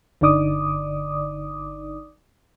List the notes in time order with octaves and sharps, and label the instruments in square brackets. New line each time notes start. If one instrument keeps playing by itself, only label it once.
[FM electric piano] G1 D3 D#4 D5 D6 D#6